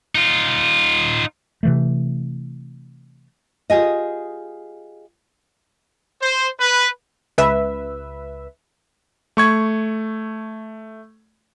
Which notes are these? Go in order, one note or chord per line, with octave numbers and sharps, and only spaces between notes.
D#4 F4
C3 E3 A3
F4 G4 G#4 D#5
C5
B4
C#2 B4 E5
A3 C#6 G#6